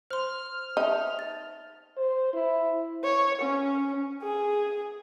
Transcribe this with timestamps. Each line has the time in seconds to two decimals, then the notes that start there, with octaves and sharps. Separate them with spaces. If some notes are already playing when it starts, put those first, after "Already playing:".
0.11 C5 C6 F6
0.77 D#4 E5 A5
1.19 A6
1.97 C5
2.34 E4
3.04 C#5
3.41 C#4
4.22 G#4